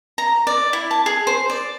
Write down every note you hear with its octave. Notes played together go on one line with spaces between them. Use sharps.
A#5
D5
E4
A5
G#4
C5
D5